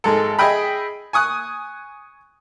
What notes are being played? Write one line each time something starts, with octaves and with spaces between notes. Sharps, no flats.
G#1 G#3 A4
G#4 D#5 E5 G5 B5
G#5 C#6 D#6 F#6